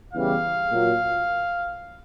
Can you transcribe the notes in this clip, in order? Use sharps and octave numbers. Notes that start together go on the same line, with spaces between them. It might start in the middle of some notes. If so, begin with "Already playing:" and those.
E2 C#3 E3 G3 F5
A#2 F#3